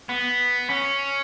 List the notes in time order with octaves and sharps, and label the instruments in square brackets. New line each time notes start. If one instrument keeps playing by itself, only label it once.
[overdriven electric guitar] B3
C#4